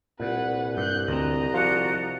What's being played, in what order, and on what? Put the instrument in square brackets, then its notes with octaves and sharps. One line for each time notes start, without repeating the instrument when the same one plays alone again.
[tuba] C2 [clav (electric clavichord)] A#2 [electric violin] B4 F#5
[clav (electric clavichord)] G2 [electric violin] F#6 G6
[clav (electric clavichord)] D2 C4 [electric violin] D#5 A#5
[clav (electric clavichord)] F3 F4 [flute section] F#4 D5